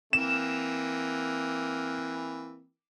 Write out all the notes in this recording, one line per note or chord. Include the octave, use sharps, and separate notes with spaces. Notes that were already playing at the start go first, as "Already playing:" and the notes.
E3 A#3 C4 E7